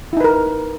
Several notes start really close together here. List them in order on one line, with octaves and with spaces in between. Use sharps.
E4 D#4 B4 A#4